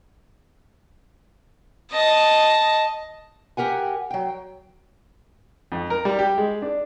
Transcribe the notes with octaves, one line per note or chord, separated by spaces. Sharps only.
D#5 A5
G4 A#4 F#5 G#5
F#3 G5
F2
A#4
G3
G4
G#3
D4